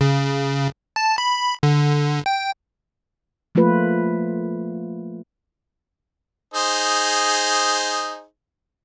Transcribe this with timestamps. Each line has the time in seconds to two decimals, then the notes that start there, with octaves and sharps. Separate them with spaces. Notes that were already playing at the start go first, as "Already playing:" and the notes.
0.01 C#3
0.96 A5
1.18 B5
1.63 D3
2.26 G5
3.55 F3 A3 A#3 F4 B4
6.54 D#4 G#4 C5